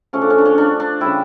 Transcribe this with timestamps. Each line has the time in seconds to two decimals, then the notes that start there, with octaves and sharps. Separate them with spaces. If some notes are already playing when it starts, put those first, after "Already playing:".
0.13 C#3 F3 A3 C#4
0.21 D4
0.30 C#4
0.38 D4
0.45 C#4
0.58 D4
0.80 D4
1.01 C#3 G3 E4